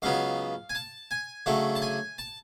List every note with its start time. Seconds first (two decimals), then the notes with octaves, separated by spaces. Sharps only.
0.02 C#2 C#3 F#3 B3 F5
0.70 G#5
0.75 A5
1.11 G#5
1.46 C#3 F#3 A3 D4
1.76 A5
1.82 G#5
2.18 A5